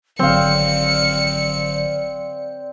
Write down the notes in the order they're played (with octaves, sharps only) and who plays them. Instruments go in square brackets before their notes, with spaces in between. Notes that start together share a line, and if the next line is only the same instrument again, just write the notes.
[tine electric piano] G#1 D3 F#3 [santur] C4 F5 [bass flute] D5 [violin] C#7